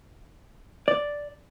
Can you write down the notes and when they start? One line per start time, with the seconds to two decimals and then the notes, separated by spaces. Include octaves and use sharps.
0.88 D5